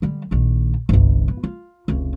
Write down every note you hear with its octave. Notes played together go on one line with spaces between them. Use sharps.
D3 G3
A#1 D#3
G1 C2
B3
F4
F1 C#2